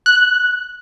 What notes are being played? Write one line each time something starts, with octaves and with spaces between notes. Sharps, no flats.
F#6